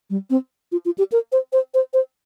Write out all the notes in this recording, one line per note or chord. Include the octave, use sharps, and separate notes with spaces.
G3
C4
F4
F4
G4
A#4
C5
C5
C5
C5